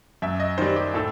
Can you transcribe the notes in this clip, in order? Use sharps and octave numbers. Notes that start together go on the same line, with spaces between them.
F#2 E5
D#5
D#3 G3 C5
G4
A2 A4